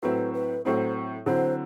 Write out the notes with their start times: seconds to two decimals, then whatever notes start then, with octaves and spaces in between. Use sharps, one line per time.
0.03 A2 F#3 C4 E4 B4
0.34 B4
0.65 A2 F#3 C4 E4 C5
1.26 D3 F#3 C4 E4 C5